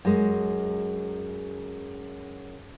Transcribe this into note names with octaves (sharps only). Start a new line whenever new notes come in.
F#2 G#3